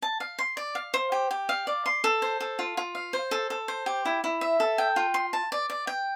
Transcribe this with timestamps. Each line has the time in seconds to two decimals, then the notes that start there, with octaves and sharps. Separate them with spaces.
0.02 A5
0.20 F5
0.39 C6
0.57 D5
0.75 F5
0.94 C5
1.12 G4
1.31 G4
1.49 F5
1.67 D5
1.86 C6
2.04 A4
2.22 C5
2.40 A4
2.59 F4
2.77 F4
2.95 F5
3.13 C5
3.31 A4
3.50 A4
3.68 C5
3.86 G4
4.05 E4
4.24 E4
4.41 E5
4.60 A4
4.78 G5
4.96 F4
5.14 C6
5.33 A5
5.52 D5
5.70 D5
5.87 G5